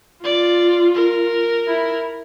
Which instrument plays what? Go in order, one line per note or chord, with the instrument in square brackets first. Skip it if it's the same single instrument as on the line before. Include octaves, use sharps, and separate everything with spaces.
[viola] F4 [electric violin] D5
[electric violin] A#4
[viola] E4